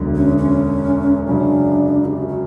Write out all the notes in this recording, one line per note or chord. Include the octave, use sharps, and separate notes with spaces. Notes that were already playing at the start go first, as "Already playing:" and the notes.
Already playing: E1 D2 D3 F#3
C#4
C#4
F#2 C#3 F#3 C#4 D4
G4
F#4
F#4